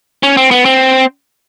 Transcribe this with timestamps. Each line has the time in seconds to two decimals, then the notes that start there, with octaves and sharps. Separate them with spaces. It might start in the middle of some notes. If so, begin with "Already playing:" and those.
0.23 C#4
0.37 C4
0.51 B3
0.65 C4